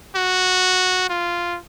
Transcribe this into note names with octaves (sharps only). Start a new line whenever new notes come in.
F#4
F4